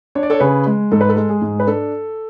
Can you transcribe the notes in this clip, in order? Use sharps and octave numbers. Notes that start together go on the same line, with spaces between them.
D4 C#5
D5
A4 C#5
C#3 G#4 B4
G#3
G#2 A4
B4
A4
G#3
G#4
G#2
B4
D4 A4